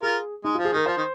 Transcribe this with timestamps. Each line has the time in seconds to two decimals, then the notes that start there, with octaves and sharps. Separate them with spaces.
0.02 F4 G#4 A#4
0.44 G#3 D#4
0.55 F4
0.58 F3
0.65 G#4
0.73 D#3 A#4
0.86 F3 C5
0.97 D#3